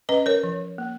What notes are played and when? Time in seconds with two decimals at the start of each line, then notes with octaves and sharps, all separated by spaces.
0.09 C#4 B4 D#5
0.26 A#4 C#5
0.43 F3
0.78 A#3